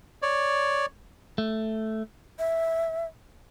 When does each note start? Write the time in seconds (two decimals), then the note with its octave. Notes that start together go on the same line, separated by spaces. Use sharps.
0.22 C#5 D5
1.38 A3
2.39 E5